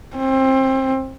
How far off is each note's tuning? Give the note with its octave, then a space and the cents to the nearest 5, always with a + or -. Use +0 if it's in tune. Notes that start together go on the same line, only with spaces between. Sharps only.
C4 +25